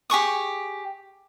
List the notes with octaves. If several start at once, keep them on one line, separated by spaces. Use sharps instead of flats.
G4 G#4 C#6 D#6